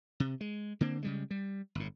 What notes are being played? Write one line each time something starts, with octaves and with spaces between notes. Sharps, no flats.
C3
G#3
D3 A#3 C4
C#3 G3 G#3
G3
G1 A2